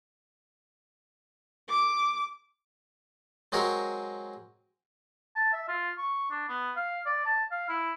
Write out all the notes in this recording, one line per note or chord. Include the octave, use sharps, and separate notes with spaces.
D6
F#3 G#3 C4 A#4 C#5
A5
E5
F4
C#6
D4
B3
F5
D5
A5
F5
E4